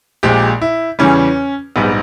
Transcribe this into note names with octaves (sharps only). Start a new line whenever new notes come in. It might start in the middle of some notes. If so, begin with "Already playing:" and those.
A#1 A#2 G#3 G4
E4
E2 C#3 E3 G3 C#4
A#1 G#2 G3 B3